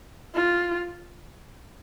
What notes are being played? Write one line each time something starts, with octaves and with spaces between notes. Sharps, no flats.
F4